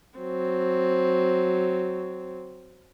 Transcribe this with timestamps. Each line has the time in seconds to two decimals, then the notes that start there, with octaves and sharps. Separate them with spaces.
0.19 F#3 C4